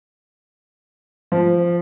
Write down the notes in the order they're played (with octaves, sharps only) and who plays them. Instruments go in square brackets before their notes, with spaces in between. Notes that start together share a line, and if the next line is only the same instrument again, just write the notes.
[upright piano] F3